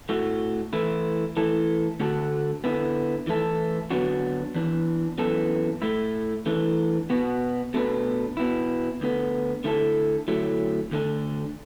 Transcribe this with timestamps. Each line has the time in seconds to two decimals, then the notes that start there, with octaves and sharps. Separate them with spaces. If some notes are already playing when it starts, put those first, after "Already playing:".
0.09 A2 A3 F#4
0.73 E3 A3 E4
1.37 E3 A3 E4 A4
2.00 D2 D3 A3 F#4 A4
2.64 D3 B3 E4
3.27 E3 A3 E4 A4
3.91 D3 F#3 B3 D4 F#4
4.55 E2 E3 D4
5.18 F#2 E3 B3 E4 A4
5.82 A2 A3 E4
6.46 E3 A3 D4
7.10 B2 B3 F#4
7.74 B2 A3 D4 B4
8.37 B2 B3 E4
9.01 D2 D3 B3
9.64 D3 A3 E4 A4
10.28 D2 D3 F#3 A3 E4
10.91 D2 D3 A3 D4